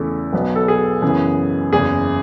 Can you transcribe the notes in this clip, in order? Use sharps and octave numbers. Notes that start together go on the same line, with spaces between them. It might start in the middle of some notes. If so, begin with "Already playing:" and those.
Already playing: E2 C#3 E3 A3
B1 B2 F#3 B3
A4
G#4
F#2 C#3 E3 B3
F#1 E2 C#3 G#4